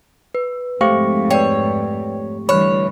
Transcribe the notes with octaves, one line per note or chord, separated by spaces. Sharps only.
B4
F2 G#2 A3 G4 A4 C5 F5 C#6
B4 C#5 D5 G5
D3 E3 G3 C#5 B5 F6 F#6